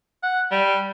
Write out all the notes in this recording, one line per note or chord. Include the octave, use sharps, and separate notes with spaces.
F#5
G3